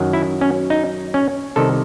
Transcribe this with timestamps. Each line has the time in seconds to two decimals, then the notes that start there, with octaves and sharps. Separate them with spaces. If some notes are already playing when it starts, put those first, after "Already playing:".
Already playing: F#2 D#3 F#3
0.13 E4
0.41 C#4
0.70 D#4
1.14 C#4
1.56 C2 C3 D#3 A4